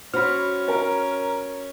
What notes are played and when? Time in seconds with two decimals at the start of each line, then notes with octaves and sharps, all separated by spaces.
0.14 C#4 F#4 C5 B5 F6
0.68 A#4